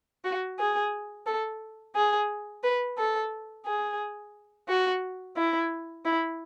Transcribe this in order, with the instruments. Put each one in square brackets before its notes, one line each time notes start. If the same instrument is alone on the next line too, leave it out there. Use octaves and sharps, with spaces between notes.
[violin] F#4
G#4
A4
G#4
B4
A4
G#4
F#4
E4
E4